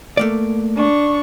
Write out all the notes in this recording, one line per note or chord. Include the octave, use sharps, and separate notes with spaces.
A3 A#3 D5
D4 C#6